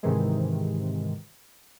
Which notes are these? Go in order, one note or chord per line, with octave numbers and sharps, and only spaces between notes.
G#2 C3 D#3 E3 G#3